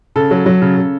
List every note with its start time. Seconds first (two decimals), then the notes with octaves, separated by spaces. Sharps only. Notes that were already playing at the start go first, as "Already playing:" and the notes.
0.16 C#3 A4
0.31 F#3
0.46 F#3
0.62 C#3
0.77 C#3